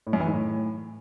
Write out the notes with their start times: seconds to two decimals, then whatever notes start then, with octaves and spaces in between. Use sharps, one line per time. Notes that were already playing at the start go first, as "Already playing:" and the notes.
0.07 A2
0.13 F#2
0.20 E3
0.27 G#2
0.33 A2